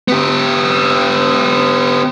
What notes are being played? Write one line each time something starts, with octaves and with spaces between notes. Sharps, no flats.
B3 G4